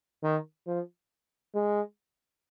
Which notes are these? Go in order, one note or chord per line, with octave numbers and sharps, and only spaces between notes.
D#3
F3
G#3